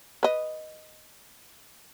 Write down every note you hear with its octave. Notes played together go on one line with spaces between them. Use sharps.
B4 D#5